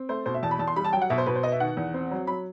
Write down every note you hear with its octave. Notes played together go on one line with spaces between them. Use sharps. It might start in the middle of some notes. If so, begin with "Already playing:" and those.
Already playing: C4
A3 C5
B2 C5
E5
E2 A5
B5
E2 A5
C6
G3 B5
A5
F#3 G5
F#5
B2 E5
C5
B2 B4
C5
B3 D#5
E5
D#3 F#5
E2
C4
F#3
F#3 B5